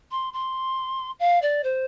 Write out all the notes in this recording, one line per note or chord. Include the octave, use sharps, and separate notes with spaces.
C6
C6
F5
D5
C5